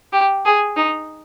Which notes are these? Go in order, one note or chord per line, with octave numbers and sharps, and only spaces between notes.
G4
G#4
D#4